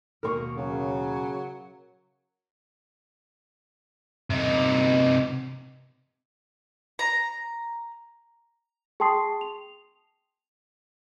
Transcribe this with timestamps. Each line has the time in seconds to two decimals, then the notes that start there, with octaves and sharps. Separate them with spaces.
0.23 D#2 B2 A#3 A#4 C#6
0.57 C#3 F#3
4.30 C3 D#4
6.99 A#5
9.00 G#4 G5 A5 C6 D#6 C7
9.41 F7